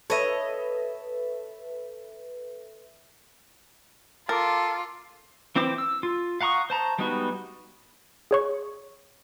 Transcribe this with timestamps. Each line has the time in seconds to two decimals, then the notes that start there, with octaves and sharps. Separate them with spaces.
0.10 A4 B4 C#5 D#5 E5
4.29 F4 A4 A#4 D6 A6
5.56 E3 C4 E4 C5 D6
5.78 E6
6.03 F4
6.41 F5 F#5 A#5 C#6 D#6
6.70 C5 A5 A#5
6.99 G3 G#3 B3 D#4 F#4
8.31 G#4 C#5 C#6